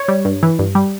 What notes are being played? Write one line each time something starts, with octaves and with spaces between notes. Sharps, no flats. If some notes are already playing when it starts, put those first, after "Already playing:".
Already playing: C#5
G3
G2
E3
G2
G3